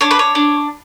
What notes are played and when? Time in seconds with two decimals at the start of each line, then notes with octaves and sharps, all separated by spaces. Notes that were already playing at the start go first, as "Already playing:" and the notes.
0.01 D4 C#5
0.11 B4
0.19 C#5
0.35 D4